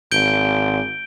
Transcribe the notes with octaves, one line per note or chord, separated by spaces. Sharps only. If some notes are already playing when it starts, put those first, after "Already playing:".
G#1 G6 D7 G7